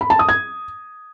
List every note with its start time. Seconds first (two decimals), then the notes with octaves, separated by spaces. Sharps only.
0.01 B5
0.10 A5
0.19 D#6
0.29 G#6